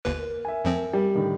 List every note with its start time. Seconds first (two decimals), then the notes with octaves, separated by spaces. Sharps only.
0.05 G1 D#2 B4
0.18 A#4
0.45 E5 G#5
0.64 F2 F3 C4
0.93 G3
1.15 A2 D3 D#3